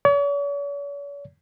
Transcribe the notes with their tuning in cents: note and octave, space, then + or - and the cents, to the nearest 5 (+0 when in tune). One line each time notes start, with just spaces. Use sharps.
C#5 +45